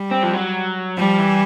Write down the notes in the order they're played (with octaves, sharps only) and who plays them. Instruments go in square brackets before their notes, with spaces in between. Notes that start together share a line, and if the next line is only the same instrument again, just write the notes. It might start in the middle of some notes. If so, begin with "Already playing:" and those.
Already playing: [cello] G3
[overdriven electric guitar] C4
F3
F#3
[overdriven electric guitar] F3 [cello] G3
[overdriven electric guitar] E3